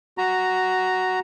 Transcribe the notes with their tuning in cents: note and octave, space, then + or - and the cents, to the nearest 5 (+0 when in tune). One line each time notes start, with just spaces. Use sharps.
F#4 +5 A#5 +0